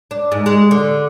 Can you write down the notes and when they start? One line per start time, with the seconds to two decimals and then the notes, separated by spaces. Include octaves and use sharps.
0.11 D4
0.32 G#2
0.46 G#3
0.71 D3